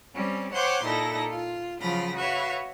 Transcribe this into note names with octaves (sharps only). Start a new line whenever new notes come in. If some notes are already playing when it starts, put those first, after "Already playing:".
G3 C4 C#4
C5 C#5 F#5 G5 C6 D6
A#2 D#4 E4 A4 A#6
F4
C#3 F3 F#3 F4 B5 A#6
F#4 B4 C#5 E5 F5